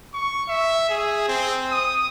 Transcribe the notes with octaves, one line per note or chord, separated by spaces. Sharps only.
C#6
E5
G#4
C4
D#6